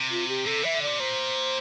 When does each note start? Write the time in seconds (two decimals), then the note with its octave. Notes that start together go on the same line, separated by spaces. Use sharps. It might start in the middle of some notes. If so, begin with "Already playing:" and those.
Already playing: C3
0.11 F4
0.28 G4
0.46 C3 A4
0.62 E3 E5
0.74 D3
0.82 D5
0.87 C3
1.00 A#2 C5